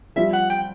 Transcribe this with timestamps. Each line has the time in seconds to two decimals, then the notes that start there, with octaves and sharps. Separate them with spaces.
0.16 F3 G3 E5
0.33 F#5
0.50 G5